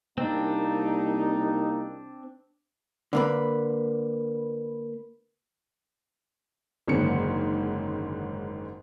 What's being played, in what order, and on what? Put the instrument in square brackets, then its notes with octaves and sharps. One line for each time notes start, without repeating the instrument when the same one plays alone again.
[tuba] C2 [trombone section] A#3 D#4 [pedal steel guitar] C4 D4
[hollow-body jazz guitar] D3 A#3 B4
[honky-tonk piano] F#1 G#2 D3 D#3 C#4 C#7